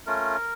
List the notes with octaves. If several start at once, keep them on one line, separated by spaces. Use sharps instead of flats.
A3 C#4 F4 A#4